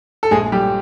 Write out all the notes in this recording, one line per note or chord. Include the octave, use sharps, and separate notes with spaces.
A4
A#1 G#3 G#4
G3 G4